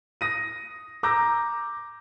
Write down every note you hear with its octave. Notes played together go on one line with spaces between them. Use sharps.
D#6 A#6 D#7
A#5 D6 E6 G6 A#6